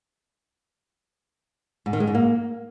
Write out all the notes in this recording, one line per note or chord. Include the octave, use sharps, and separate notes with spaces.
G#2
D#3
G#3
G#2
A#3